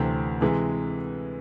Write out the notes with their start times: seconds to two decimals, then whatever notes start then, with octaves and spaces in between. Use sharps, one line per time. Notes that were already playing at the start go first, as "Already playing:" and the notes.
Already playing: D2 C3 E3 A3 C4
0.41 C3 E3 G#3